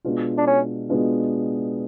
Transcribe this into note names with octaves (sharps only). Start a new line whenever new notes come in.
B2 G#3 B3 D4 F4
D4
C#4
B2 G#3 B3 D4 F4